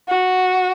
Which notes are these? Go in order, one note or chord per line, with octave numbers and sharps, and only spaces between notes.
F#4